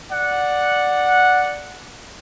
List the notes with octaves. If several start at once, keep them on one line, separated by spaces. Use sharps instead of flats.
D5 F#5